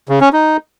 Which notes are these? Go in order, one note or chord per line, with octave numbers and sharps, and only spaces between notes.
C#3
C#4
D#4